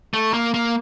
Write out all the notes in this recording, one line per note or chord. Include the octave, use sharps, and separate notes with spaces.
A3
A#3
A#3